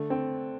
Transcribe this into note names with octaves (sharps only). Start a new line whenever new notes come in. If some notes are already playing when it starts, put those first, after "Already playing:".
Already playing: D3 A3
C4